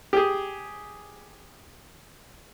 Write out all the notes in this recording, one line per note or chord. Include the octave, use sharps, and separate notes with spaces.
G4 G#4